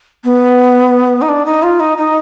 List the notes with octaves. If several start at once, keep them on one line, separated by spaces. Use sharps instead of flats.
B3
D#4
D4
D#4
F4
D#4
D#4